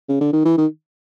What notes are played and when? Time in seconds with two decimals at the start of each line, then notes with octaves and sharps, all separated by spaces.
0.09 C#3
0.21 D3
0.33 D#3
0.45 E3
0.58 D#3